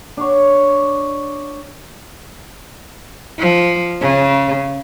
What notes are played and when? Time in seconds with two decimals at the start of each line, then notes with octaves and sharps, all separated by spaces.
0.17 D4 C#5
3.39 F3
4.02 C#3